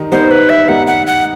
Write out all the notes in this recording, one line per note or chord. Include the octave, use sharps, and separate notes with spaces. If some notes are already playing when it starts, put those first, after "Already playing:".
Already playing: D#3 G3 D#4
D#3 G3 B3 D#4 C5
B4
E5
D#3 G3 B3 D#4 F#5
F#5
F#5